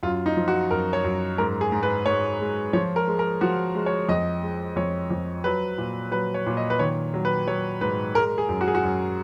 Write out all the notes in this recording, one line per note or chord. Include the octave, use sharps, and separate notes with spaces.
F#2 F4
D#4
F3
F#4
F#2 A#4
C#5
F#2
G#2 A#4
G#4
G#2
B4
G#2 C#5
G#3
F3 C#5
A#4
G#3
A#4
F3 F#4
G#3
C#5
F2 D#5
G#3
F2 C#5
F2
F#3 B4
A#2
F#3 B4
C#5
A#2
D#5
B4
D#3 C#5
F#3
B4
F#3 C#5
G#2 B4
G#3 A#4
G#4
F#2
F#4
G#4
F#4
F#2